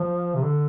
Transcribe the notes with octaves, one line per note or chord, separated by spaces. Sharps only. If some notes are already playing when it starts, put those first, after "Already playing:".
Already playing: F3
C3
D3